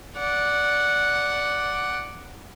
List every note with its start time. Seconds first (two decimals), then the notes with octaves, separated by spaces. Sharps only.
0.17 D5 F#5